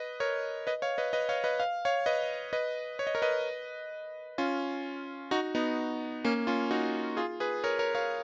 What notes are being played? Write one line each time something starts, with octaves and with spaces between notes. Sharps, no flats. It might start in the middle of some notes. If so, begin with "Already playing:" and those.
Already playing: B4 D#5
A#4 C#5
B4 D#5
C#5 F5
B4 D#5
B4 D#5
C#5 F5
B4 D#5
F5
C#5 F5
B4 D#5
B4 D#5
C#5
D#5
A#4 C#5
B4 D#5
C#4 F4
D#4 F#4
B3 D#4
A#3 C#4
C#4 F4
D#4 F#4
F4 G#4
G#4 B4
A#4 C#5
A#4 C#5
C#5 F5